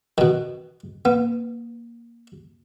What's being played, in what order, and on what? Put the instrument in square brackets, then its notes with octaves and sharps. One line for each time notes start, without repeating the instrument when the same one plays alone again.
[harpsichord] B2 D#3
[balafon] A#3 [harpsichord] B3